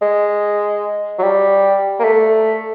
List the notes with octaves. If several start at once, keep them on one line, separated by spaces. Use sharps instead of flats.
G#3
F#3
G3
A#3
A3